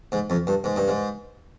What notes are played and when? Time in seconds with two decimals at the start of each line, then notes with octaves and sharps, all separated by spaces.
0.12 G#2
0.30 F2
0.47 G2
0.64 G#2
0.76 G2
0.88 G#2